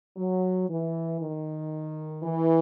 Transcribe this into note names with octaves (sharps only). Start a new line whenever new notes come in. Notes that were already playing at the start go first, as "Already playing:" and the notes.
F#3
E3
D#3
E3